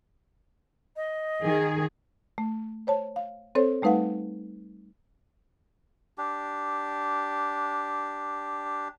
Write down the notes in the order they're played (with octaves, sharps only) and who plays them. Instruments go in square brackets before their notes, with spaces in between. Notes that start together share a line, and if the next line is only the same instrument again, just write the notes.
[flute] D#5
[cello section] D#3 G#4
[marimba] A3
C5 C#5 A5
F5
C4 A4 C5 C#5
G3 A3 D#4 B4 F5 F#5
[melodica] D4 G4